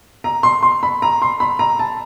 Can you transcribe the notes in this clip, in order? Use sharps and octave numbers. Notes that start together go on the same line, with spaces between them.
A#5
C6
C6
B5
A#5
C6
B5
A#5
A5